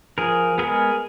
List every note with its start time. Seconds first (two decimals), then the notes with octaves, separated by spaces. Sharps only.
0.18 F3 G#4 A#4
0.58 G#3 B3 G#4 A#4